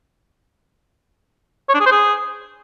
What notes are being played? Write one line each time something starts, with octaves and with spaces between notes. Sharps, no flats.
C#5
D4
G#4
C5
G#4